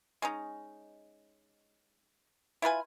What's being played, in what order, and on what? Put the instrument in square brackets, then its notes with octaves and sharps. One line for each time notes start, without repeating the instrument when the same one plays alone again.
[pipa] G#3 C#4 D#4
E4 F4 B4 G#5